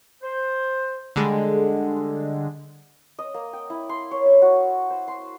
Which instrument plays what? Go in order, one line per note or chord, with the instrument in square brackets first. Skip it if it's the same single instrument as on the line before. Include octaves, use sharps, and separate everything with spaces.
[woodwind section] C5
[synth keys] D3 G3 G#3
[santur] D#5
A#3
G5
E4
C6
C#5
E5
F#4
C5
C6